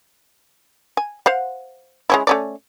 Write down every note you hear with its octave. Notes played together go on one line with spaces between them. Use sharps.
G#5
C5 F5 F#5
G#3 C#4 E4
A3 C#4 D5